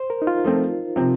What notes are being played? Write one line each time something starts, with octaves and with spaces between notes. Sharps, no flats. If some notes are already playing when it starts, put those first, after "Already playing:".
Already playing: C5
A#4
D#4
F4
F3 A3 C4
C3 F3 C4